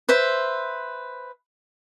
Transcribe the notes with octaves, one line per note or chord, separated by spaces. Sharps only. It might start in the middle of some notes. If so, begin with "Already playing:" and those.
B4 C5 E5